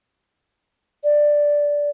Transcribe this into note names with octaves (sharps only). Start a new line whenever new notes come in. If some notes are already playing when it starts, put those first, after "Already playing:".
D5